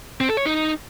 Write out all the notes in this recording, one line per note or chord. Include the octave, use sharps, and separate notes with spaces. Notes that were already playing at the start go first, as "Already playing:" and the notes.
C4
A4
C#5
D#4